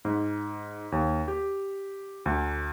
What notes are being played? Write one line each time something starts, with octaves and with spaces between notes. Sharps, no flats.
G#2
D#2
G4
D2